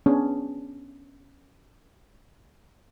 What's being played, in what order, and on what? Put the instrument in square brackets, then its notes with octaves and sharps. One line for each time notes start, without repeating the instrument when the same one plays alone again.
[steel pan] B3 C#4 D4 G#4